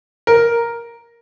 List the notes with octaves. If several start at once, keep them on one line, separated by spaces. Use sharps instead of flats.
A#4